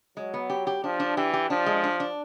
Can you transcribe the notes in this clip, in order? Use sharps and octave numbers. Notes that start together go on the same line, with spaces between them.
F#3 G#3
B3
G4
G4
F3 D4
D4
E3 G4
G4
F3 D4
G#3
D4
D4